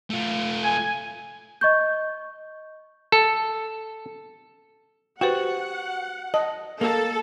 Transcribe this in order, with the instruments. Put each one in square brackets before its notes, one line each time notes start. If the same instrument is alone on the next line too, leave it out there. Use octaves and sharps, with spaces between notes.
[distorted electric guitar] A3 F4
[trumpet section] G#5
[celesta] D#5 C#6 G6
[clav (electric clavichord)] A4
[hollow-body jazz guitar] F#4 [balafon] G4 B4 C5 [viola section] F#5 [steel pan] G5
[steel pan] D#5 [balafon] A5
[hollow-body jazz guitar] A#3 [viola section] A4